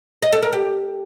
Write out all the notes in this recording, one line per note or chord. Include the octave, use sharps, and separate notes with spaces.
D#5
A4
A#4
G4